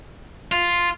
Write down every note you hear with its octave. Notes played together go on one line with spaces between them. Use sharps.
F4